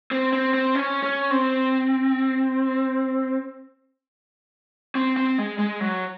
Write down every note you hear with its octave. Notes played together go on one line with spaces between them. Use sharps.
C4
C4
C4
C#4
C#4
C4
C4
C4
G#3
G#3
F#3